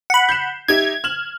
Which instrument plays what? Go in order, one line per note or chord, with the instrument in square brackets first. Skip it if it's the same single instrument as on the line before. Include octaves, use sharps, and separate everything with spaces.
[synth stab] F#5 B5
[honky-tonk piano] G6 C7 E7
[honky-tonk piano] D#4 G4 E5 [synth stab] G#6
[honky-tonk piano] F6 E7 F#7